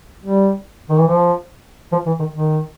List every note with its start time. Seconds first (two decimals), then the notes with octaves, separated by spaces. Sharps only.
0.24 G3
0.90 D#3
0.98 E3
1.07 F3
1.92 F3
2.06 E3
2.19 D#3
2.33 D#3